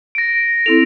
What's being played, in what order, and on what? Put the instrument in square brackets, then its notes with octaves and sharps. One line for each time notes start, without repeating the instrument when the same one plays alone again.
[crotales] A#6 D7
[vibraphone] C4 E4 A4 [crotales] F7